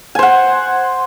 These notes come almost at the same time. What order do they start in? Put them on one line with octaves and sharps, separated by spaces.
G#5 C5 F#5